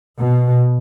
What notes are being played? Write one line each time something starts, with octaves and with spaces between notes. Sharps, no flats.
B2